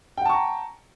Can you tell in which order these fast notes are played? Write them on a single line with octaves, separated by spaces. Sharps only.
G5 F#5 A5 C#6 A#5